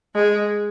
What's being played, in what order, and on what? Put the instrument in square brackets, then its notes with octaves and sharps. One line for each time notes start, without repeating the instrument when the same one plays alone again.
[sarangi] G#3